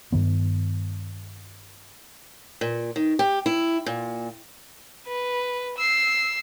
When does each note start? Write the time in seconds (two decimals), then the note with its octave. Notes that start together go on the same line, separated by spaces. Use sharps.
0.12 G2 D#3 B3
2.61 A#2
2.96 D#3
3.19 G4
3.46 E4
3.86 A#2
5.07 B4
5.77 E6 C7